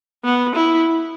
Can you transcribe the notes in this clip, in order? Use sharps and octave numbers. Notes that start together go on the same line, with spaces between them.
B3
E4